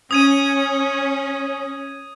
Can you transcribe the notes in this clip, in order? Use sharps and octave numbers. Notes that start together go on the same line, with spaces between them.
C#4 D#6 G#6 D#7